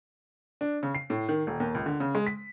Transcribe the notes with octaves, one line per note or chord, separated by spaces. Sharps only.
D4
C#3
C7
A2
D#3
D#1
D#2
C#2
D3
C#3
G#3
B6